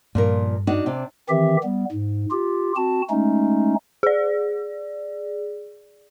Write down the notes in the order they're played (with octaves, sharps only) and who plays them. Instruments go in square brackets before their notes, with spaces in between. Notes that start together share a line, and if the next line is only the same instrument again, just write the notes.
[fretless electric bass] G2 [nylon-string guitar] A#2 F3 A#4
[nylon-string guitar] D4 D#4 F#4
C3 D4
[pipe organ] D#3 E3 C4 G4 E5
G3 B3
G#2
F4 G4
C4 F#4 A5
G#3 A3 C#4 D#4
[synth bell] G#4 D5